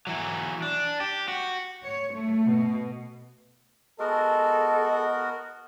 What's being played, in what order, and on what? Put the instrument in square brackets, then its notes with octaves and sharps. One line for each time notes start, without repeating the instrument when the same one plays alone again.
[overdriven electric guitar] E3 F#3
D4
G4
F#4
[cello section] C#5
A3
B2
[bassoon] G#3 [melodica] B3 F#4 A#4 [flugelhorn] A4